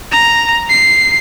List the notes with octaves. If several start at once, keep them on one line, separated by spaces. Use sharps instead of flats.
A#5
C7